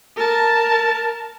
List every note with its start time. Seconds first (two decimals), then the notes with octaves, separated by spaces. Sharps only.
0.16 A#4 A5